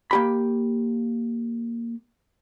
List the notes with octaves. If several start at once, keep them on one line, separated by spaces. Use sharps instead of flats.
A#3 G4 B5